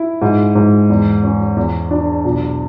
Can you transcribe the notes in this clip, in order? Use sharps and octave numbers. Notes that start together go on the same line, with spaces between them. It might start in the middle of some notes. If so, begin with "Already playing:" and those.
Already playing: E4
G#2
G#2
E2
C#4
E2
D4
B1